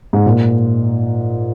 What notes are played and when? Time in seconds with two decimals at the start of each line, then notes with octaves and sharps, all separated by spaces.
0.13 G#2
0.26 A#2